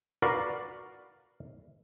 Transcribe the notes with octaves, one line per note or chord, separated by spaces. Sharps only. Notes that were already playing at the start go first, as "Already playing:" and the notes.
F#4 A#4 B4 D5 F5